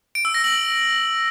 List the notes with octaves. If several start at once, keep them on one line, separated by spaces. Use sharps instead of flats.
D7
E6
A#6
F#7